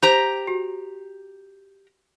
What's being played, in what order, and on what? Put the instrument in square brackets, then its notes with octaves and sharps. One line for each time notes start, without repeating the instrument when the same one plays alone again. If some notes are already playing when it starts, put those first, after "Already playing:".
[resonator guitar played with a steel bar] G4 A#5 [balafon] C5
[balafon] F#4